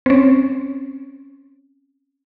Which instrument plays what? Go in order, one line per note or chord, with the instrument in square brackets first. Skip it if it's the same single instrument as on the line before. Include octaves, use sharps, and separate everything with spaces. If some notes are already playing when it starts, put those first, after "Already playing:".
[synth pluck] C4 C#4